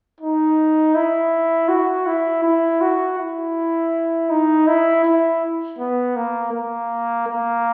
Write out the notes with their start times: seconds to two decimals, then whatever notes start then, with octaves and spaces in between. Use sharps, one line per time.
0.20 D#4
0.95 E4
1.69 F#4
2.07 E4
2.43 E4
2.81 F#4
3.19 E4
4.30 D#4
4.68 E4
5.05 E4
5.79 B3
6.16 A#3
6.53 A#3
7.27 A#3